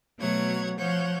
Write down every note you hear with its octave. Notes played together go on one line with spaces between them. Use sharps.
B2 F#3 A3 C#5 F#5 G#6
F3 C#5 F#5 G6